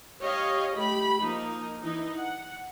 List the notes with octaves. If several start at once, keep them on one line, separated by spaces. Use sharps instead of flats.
G4 C#5 D#5 F5
A3 G4 B5
F3 A#3 D#4
E3 D#4
F#5